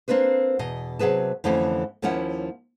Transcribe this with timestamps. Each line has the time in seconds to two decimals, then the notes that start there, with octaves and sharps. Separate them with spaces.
0.08 A#3 C4 D4 B4 C5
0.59 E2 B2 D#5
0.99 C3 F#3 G#4 B4 A5
1.44 F2 D3 E3 A3 C#4
2.02 D#2 F3 A#3 C#4 E4 F#5